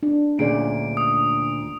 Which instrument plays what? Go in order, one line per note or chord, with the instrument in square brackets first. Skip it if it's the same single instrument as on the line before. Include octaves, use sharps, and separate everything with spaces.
[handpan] D4
[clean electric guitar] D2 A#2 [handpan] C#4 G#4 D5 [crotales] D7
[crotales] D#6